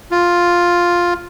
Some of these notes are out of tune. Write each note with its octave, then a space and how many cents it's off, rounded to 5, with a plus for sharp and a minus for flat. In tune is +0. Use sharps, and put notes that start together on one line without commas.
F4 +5